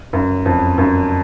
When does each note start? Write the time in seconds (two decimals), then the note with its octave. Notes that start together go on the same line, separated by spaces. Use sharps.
0.13 F#2
0.46 F2
0.78 F#2